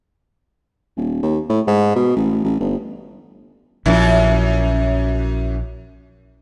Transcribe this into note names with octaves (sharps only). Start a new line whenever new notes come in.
D#1
D#2
A2
G#2
B2
A1
A1
G1
A#1 F#2 F3 E4